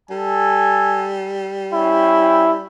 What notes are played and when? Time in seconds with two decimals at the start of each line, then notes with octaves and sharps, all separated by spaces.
0.10 G3 A4 G#5
1.73 C#4 E4 G5